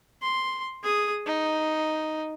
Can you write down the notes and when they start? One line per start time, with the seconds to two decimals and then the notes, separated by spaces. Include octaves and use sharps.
0.22 C6
0.83 G#4 D#6
1.26 D#4